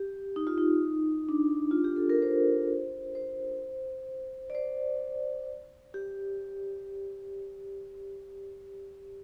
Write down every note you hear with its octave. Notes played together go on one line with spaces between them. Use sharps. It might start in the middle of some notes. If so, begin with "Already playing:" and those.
Already playing: G4
D#4
F4
D#4
D4
F4
G4
A4
A#4
C5
C5
D5
C5
G4